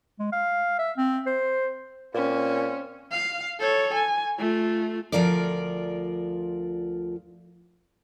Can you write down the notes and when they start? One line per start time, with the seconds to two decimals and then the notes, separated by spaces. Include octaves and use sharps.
0.19 G#3
0.32 F5
0.79 E5
0.97 C4
1.26 C5
2.14 A#2 C4 C#4
3.12 F5
3.60 A4 C#5
3.94 G#5
4.39 A3 F4
5.12 D2 B2 F3 F4 A#4 D5